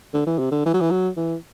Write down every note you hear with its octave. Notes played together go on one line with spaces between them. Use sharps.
D3
E3
C3
D3
E3
F#3
E3
F#3
E3